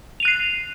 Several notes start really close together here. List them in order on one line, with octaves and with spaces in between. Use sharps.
F7 D#7 F#6 C7